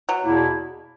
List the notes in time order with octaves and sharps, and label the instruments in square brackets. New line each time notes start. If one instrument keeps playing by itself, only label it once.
[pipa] F#3
[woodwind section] E2 B2 A#3 E4